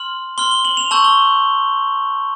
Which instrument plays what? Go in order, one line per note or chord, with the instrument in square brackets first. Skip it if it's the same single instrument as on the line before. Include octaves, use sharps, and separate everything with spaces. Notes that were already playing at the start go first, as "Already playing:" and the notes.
Already playing: [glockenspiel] C6 F6 F#7
C6 F6 G7
G7
F#7
F7
A5 C#6 E6 G6 F#7
G7